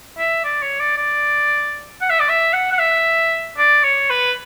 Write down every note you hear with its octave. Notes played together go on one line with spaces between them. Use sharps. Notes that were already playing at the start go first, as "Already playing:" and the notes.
E5
D5
C#5
D5
D5
F#5
E5
D5
E5
F#5
F#5
E5
D5
C#5
B4